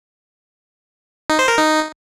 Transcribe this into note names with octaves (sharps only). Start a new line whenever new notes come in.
D#4
C5
A#4
D#4